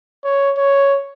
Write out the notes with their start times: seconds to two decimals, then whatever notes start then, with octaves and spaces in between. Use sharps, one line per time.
0.24 C#5
0.57 C#5